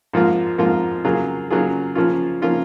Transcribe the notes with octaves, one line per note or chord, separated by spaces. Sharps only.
G#2 F3 A#3 F4
G#2 F3 A#3 F4
C#3 F#3 A#3 F4 G#4
C#3 F#3 A#3 F4 G#4
C#3 F3 A#3 C#4 F4
C#3 F3 A#3 C#4 F4